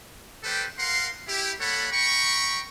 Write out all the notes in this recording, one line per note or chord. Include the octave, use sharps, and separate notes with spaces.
G3 G4 A4 B4 C5 G5
A#4 F5 F#5 C6
E4 G4
G3 A#3 A4 C#5 F#5 B5
G5 A#5 B5 C#6